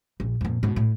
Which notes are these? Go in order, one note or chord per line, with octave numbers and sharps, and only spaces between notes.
A#1
F2 A#2
G#2 B2
A2